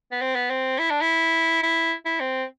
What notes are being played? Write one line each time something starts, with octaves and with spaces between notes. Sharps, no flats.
B3
C4
B3
C4
E4
D4
E4
E4
E4
C4